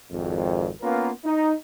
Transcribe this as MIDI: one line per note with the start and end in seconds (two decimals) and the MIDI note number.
0.11 0.69 32
0.11 0.69 41
0.82 1.10 58
0.82 1.10 59
0.82 1.10 61
0.82 1.10 65
0.82 1.10 70
0.82 1.10 71
1.25 1.52 63